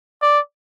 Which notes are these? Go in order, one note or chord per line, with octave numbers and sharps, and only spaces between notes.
D5